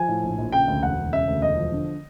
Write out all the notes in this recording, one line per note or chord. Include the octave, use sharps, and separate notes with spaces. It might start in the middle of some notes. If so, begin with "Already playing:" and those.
Already playing: F3 G#5
A2
A#1
A#1
C#3 G5
D2
E1 F#5
E1
C#3 E5
D2
E1 D#5
F3
D3